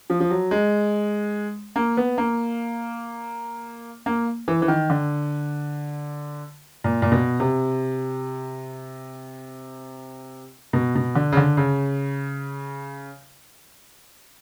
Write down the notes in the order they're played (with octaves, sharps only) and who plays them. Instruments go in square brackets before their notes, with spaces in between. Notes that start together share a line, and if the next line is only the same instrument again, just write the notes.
[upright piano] F3
F3
F#3
G#3
A#3
B3
A#3
A#3
E3
E3
D#3
D3
A#2
A#2
B2
C3
B2
B2
D3
C#3
D3
C#3